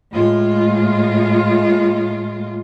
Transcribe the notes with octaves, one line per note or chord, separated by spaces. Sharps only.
A2 G#3 F4